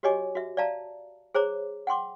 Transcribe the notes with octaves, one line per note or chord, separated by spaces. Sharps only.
F#4 G4 C#5 D#5 G#5 D6
F#4 E5
D5 E5 F5 A5 A#5
G#4 C5 C#5 A#5 D6
F#5 G5 C6 D6